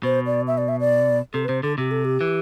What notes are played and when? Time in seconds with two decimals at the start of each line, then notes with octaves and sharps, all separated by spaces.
0.03 B2 C5
0.26 D5
0.47 E5
0.58 D5
0.68 E5
0.80 D5
1.34 C3 A4
1.45 B4
1.49 C3 C5
1.63 D3 A4
1.78 C3 G4
1.91 A4
2.05 G4
2.21 E3